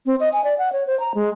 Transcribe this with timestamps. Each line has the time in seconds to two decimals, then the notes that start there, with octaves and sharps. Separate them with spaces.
0.06 C4
0.20 D#5
0.33 G#5
0.44 D5
0.58 F#5
0.73 C#5
0.87 C5
1.00 A#5
1.15 G#3